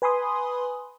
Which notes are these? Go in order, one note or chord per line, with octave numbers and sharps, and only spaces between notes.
B4 G#5 B5 C6 D#6